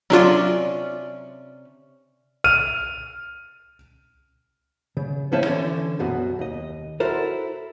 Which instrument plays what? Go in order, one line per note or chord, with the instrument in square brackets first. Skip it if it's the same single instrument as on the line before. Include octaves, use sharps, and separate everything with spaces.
[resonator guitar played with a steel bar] C3 C#4 D5 [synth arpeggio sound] F#3 D4 F4
[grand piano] F6 D#7
[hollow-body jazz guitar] C#3
A2 F3 C#4 E4 C5 A5
D3 E3 C#4
C2 F#2 B2 F#4
D#2 D#5
E4 F#4 A4 A#4 C5